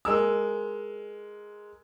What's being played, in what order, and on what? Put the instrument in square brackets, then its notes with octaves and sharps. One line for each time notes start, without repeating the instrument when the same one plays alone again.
[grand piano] G#3 A#4 E6